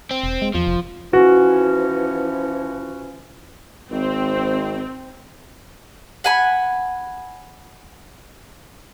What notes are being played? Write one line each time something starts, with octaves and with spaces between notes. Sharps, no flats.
C4
E1
G#3
E2 F3
F1
E3 F3 C#4 F#4
G#1 C4
F#5 G#5 B5